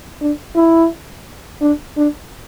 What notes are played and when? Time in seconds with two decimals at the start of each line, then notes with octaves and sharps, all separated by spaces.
0.21 D4
0.55 E4
1.61 D4
1.97 D4